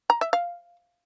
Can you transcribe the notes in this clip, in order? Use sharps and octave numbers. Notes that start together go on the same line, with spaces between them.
A#5
E5
F5